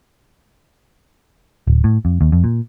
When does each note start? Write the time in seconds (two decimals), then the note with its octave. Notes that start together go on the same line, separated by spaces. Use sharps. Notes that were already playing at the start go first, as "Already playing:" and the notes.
1.67 D1
1.84 A2
2.05 F2
2.21 D#2
2.32 F2
2.44 A#2